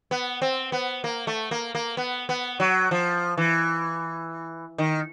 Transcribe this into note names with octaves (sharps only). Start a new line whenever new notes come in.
B3
C4
B3
A#3
A3
A#3
A#3
B3
B3
F#3
F3
E3
D#3